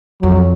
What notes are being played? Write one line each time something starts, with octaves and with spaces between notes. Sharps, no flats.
F2 F#3